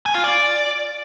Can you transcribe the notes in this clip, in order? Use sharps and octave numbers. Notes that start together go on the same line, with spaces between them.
G#5
F4
D5